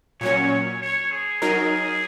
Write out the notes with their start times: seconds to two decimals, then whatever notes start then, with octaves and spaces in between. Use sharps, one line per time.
0.21 A#2 F#3 C#4 C#5
0.82 C#5
1.12 G#4
1.42 F#3 D#4 A#4